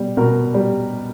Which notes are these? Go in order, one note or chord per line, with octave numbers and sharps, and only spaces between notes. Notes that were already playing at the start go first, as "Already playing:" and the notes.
Already playing: B2 G3
B2 A#4
G3